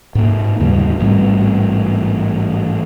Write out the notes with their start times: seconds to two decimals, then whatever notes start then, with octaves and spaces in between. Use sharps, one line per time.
0.15 G#2 A#3
0.60 D#2 G#2 C#3 G3
1.00 A1 G#2 G3 C4